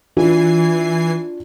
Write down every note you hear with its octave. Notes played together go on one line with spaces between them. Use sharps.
E3 D4 F4 F#4 G#5 C7